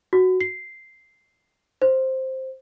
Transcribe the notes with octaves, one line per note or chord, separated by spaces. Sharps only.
F#4
C7
C5